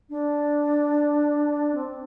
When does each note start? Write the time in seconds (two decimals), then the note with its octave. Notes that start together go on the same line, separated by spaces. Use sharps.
0.10 D4
1.74 C4